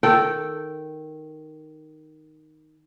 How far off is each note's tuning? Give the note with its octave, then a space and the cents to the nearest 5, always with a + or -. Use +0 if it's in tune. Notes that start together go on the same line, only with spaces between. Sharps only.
D#3 +0 A4 +0 G5 -15